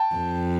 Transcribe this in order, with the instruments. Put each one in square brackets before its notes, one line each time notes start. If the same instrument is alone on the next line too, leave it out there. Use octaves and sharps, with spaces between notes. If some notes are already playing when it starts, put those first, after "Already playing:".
Already playing: [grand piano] G5 A5
[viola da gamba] F2